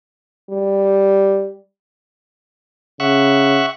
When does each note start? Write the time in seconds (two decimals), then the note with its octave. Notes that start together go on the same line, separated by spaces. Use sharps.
0.50 G3
3.00 C#3 E5 F#5 C#6